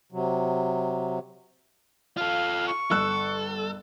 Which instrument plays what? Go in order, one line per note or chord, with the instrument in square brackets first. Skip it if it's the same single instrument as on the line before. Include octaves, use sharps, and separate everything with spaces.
[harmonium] C3 F#3
[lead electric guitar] F4 A4 [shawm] F5
[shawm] C#6
[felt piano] G1 E6 F#6 [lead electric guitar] A4